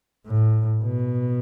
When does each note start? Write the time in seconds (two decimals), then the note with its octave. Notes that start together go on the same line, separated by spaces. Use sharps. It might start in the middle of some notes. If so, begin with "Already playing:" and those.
0.26 A2
0.83 B2